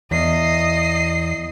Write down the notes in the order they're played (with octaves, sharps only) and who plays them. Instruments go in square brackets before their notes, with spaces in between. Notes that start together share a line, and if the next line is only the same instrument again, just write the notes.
[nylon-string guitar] E2 [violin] D#5 C7